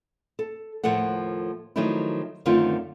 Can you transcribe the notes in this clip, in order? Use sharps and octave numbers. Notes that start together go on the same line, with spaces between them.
A4
D#2 A2 F3 A#3 A4 F#5
D#3 F3 F#3 A3 D#4 E4
F#2 D3 D#3 A3 C4 F4